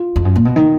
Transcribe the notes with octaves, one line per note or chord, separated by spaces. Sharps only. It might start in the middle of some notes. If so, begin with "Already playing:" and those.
Already playing: F4
F2
F#2
A#2
B2
D#3